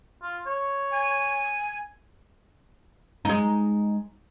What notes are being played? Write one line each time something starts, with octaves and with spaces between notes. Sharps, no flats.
F4
C#5
G#5
G#3 D#4